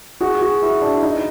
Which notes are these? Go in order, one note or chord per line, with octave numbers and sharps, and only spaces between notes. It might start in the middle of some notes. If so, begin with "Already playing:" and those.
F#4 G#4
F#4 G#4
E4 F#4
D4 E4
D#4